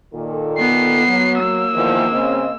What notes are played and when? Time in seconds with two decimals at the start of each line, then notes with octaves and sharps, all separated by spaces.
0.14 A#2 D#3 A4
0.58 B3 C7
1.07 F#3
1.40 A#3 E6
1.73 E2 D#3 F3
2.12 C#3 C4 D#5